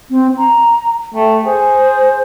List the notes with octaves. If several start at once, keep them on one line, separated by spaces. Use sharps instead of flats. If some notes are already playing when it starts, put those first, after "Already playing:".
C4
A#5
A3 G5
G#4 C5